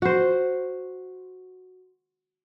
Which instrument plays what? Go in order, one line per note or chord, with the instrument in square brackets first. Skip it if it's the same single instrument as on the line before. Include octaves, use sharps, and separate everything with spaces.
[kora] F#4 C5